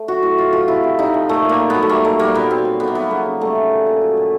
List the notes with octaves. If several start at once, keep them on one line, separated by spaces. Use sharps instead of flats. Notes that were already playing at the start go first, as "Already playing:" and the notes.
Already playing: A3
F#3 F#4
A2 F#4
F#3 F4
A3 F4
C3 E4
C3
C3 D#4
F3
A#2 A3
A#2 A#3
A3
F#3 B3
A3
G3 A#3
A#2 A3
G3 A#3
A#2 B3
F#3 C4
F#3
A3 B3
A#3
F#3 B3
C#3 A#3
C#3
G3 A3
C#3
A#2
A#2
F#3
A#2